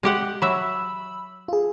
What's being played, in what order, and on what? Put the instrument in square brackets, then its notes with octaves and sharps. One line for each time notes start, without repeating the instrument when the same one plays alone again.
[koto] G#3 G4 F#5
[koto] F#3 E5 [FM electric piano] B5 E6
[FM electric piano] F4 G#4